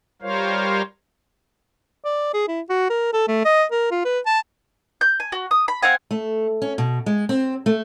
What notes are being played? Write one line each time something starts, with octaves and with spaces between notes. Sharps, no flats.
G3 F4 A#4 C5 C#5 F5
D5
G#4
E4
F#4
A#4
A4
A3
D#5
A#4
F4
B4
A5
G6
G#5
F#4
D#6
B5
C4 F5 F#5 G#5
A3
C#4
B2
G#3
C4
A3